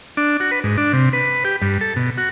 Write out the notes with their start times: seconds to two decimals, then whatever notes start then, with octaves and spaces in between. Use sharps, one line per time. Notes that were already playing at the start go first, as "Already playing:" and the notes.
0.17 D4
0.40 F#4
0.51 B4
0.64 G#2
0.77 D4
0.93 C3
1.13 B4
1.45 G4
1.62 G2
1.81 A4
1.96 B2
2.18 F#4